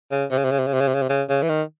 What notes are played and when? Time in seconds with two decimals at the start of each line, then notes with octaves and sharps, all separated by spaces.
0.11 C#3
0.31 C3
0.38 C#3
0.44 C3
0.52 C#3
0.59 C3
0.67 C#3
0.74 C3
0.81 C#3
0.88 C3
0.95 C#3
1.02 C3
1.09 C#3
1.29 C#3
1.43 E3
1.49 D#3